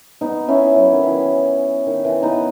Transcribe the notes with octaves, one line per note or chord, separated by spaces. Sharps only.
B3 D#4
C#4 E4
F#3
D#3
E3
D#3
E3
B3 D#4